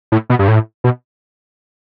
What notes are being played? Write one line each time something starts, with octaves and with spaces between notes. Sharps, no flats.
A2
B2
G2
A2
B2